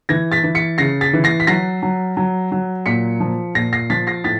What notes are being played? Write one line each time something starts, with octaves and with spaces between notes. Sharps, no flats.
E3 G#6 A#6
A6 B6
E3
B6 C#7
C#3 A#6 C7
A6 B6
E3
A#6 C7
B6
F#3 A#6 C7
F#3
F#3
F#3
A#2 B6 C#7
F3
A#2 A#6 C7
A#6 C7
F3 A6 B6
A#6 C7
A2 A6 B6